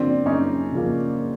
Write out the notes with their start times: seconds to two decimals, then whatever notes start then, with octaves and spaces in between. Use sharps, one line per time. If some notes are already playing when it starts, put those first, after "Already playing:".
Already playing: C#3 F3 A#3 C4 D4
0.26 C#4 D#4
0.72 C#3 F3 A#3